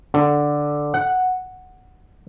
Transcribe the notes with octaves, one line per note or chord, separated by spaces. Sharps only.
D3
F#5